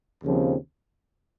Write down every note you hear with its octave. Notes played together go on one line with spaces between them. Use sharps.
D#2 C#3 F3 C4